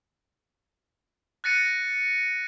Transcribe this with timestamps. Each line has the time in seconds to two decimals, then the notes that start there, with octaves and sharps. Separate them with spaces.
1.44 F#6 A6 A#6 C#7 D#7